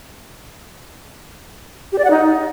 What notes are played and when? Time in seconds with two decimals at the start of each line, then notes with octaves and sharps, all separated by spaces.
1.92 G4
1.98 D5
2.04 F#5
2.10 D#4